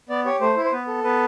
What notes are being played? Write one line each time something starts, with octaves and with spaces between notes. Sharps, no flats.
B3 D5
G4 C#5
A3 C5
E4
C5
B3 B4
A4
B3 B4